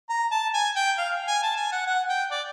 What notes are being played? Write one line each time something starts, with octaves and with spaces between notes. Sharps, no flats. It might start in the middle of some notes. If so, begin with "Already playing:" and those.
A#5
A5
G#5
G5
F5
G#5
A5
G#5
F#5
F#5
G5
D5